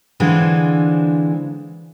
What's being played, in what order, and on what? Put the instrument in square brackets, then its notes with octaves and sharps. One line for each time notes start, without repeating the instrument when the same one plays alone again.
[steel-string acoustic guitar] D3 E3 G#3 C4 D4 F4